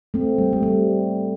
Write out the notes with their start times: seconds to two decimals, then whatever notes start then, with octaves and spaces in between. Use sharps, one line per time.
0.14 A3 C4
0.38 G3
0.53 A3
0.63 G3